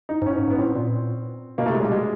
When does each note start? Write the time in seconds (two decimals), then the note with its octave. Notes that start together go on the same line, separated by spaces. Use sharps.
0.09 D#4
0.22 G#2
0.26 A2 C#4
0.37 G#2
0.48 G#2
0.50 B3
0.58 A2 C4
0.75 A#2
1.58 B2 A#3
1.66 C3 A3
1.75 G#3
1.80 A#2 G3
1.91 B2 G#3